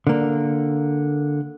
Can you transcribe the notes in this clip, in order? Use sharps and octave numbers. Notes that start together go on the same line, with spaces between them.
D3 A#3